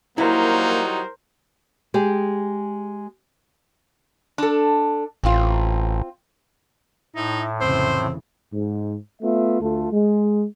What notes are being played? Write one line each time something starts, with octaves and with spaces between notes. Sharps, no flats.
F#3 G3 A#3 D#4 E4 A#4 C5
G#3 G4 G#4
D4 A4
A1 C4 F4
A2 D#4 E4
F1 C#3 E3 C4 C5
G#2
A3 B3 F4 E5
D2 A3 F4 A4
G#3